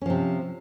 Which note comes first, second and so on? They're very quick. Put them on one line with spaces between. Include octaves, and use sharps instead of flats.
C#4 F3 C3